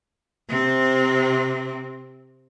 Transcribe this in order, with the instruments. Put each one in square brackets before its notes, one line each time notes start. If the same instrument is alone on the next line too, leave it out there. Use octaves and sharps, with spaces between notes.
[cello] C3 C4